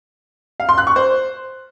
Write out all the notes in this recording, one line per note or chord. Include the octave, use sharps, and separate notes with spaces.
F5
C6
F#6
C#6
C5